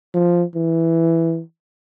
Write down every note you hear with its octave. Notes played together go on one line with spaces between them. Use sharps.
F3
E3